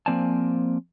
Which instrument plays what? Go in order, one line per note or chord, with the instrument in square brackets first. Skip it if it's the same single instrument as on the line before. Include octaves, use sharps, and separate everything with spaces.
[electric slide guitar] F3 A#3 C4 D5 G#5 A5